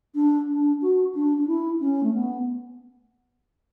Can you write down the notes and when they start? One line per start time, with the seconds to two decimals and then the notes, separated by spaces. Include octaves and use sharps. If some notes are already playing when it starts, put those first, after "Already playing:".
0.15 D4
0.49 D4
0.81 F#4
1.14 D4
1.37 D4
1.47 E4
1.80 C#4
2.03 A3
2.13 B3